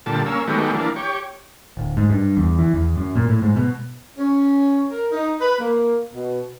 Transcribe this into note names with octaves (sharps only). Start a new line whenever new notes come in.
A#2 D3 G3 A5
A#3 C#4 E6
D#3 F#3 G#3 A3 B3 G4
E3 A#3 D4
G4 C#5
D1
G#2
G2
E2
E3
E2
F#2
A#2
A2
G#2
B2
C#4
A#4
D#4
B4
A#3
B2